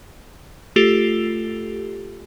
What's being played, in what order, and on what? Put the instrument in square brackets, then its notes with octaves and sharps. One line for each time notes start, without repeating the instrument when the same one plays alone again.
[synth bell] A3 F4 G4 A4